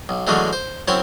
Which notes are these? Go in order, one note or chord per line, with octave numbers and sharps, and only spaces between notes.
B1
D3 E3 F#3 G#3 A3 C#4
C5
F#2 C4 E4 C#5 G5 C6